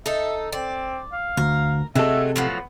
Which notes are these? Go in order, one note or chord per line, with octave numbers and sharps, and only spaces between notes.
D#4 A4 E5
C4 D5
F5
D2 A#4
C3 F#3 G#3 A3 A4 E5
A2 F3 F#3 B3